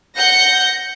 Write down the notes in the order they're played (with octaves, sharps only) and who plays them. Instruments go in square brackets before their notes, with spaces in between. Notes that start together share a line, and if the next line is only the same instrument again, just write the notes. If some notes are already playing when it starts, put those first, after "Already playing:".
[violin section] F#5 G6 A#6 C#7